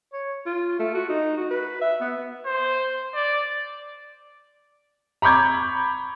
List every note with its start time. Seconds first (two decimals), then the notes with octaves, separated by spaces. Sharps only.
0.13 C#5
0.46 F4
0.79 A3
0.94 F#4
1.09 D#4
1.37 F#4
1.50 B4
1.81 E5
2.01 B3
2.46 C5
3.15 D5
5.22 A#5 B5 C#6 D6 G6 G#6